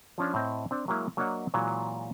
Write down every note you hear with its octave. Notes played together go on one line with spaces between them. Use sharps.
F3 C#4 D4
A2 C4 D#5
C4 D4
F#3 G#3 A#3 E4
F#3 A#3 D4 C#5 D#5 F#5
A#2 E3 F#3 G#3